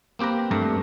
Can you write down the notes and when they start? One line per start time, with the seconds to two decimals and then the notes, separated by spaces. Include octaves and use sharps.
0.19 A#3 C4 G4 B4 A#5
0.51 G2 A3 A#5